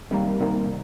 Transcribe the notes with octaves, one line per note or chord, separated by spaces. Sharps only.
C3 D#3 G3 A#3
C3 D#3 G3 A#3